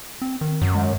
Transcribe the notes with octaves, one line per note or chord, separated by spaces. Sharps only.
C4
D#3
F#2
G#3